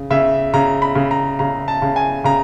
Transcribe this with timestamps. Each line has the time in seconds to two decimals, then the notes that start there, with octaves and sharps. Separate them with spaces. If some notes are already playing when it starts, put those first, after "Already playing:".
Already playing: C#3
0.11 C#3 E5
0.54 C#3 A#5
0.82 B5
0.95 C#3
1.11 A#5
1.39 C#3 A#5
1.68 A5
1.82 C#3
1.96 G#5
2.24 C#3 A#5